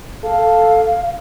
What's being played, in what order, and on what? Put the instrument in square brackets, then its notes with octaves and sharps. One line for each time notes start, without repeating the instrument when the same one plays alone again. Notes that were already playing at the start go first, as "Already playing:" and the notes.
[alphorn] A4 [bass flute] F5